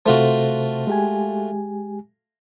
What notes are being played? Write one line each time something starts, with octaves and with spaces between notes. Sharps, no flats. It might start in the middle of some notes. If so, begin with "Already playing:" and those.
C3 A3 F4 F#4 A4 C5
G#3 G4 G#5